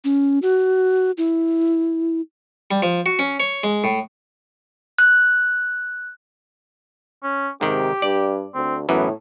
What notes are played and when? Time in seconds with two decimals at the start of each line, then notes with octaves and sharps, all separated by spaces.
0.04 C#4
0.42 F#4
1.18 E4
2.71 G3
2.82 F3
3.06 F#4
3.19 C#4
3.40 C#5
3.64 G#3
3.84 A2
4.99 F#6
7.23 C#4
7.61 G#2 C3 D#3 G4
8.02 G2 D5
8.55 D2 C4
8.89 F#2 A2 E3 B3